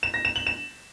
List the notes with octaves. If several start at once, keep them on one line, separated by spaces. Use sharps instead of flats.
E7
A#6
E7
F#7
E7